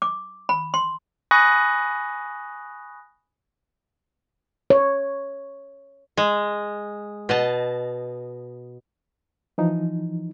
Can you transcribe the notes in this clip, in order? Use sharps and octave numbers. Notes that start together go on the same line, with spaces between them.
D6
B5
C6
G#5 B5 C#6 D#6 F#6 A#6
C#5
G#3
B2 D#5 A5
E3 F3 D#4